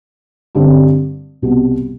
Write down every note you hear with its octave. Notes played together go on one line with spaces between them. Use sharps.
G2 D3 G3 C4
C2 B2 G3 B3